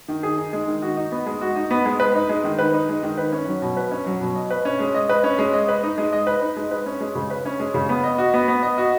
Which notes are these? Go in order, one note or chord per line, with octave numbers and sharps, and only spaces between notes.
D#3
G#4
D#4
G#3
D#3
F#4
D#4
B3
G#3
F#4
D#4
B3
G#3
B4
D#4
G#3
D#3
B4
D#4
G#3
D#3
B4
C#4
F#3
B2
B4
C#4
F#3
B2
D#5
B4
C#4
G#3
D#5
B4
C#4
G#3
D#5
B4
D#4
G#3
D#5
B4
D#4
G#3
B4
C#4
G#3
C#3
B4
C#4
G#3
C#3
B3
D#5
F#4
B3
B3
D#5
F#4